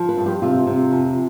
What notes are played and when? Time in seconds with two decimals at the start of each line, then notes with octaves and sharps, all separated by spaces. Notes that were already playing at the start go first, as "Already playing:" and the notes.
Already playing: F3
0.09 B4
0.17 G2
0.26 G4
0.42 C3 F4
0.67 C3
0.91 F2